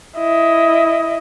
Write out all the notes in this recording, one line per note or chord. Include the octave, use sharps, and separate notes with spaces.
E4 D#5